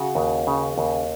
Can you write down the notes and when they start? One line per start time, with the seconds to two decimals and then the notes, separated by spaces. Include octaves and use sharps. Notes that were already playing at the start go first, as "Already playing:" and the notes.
Already playing: C#3 F#4
0.15 D#2
0.47 C#3
0.78 D#2